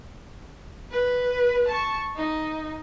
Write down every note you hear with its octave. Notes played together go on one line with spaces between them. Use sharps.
B4
A5 C#6
D#4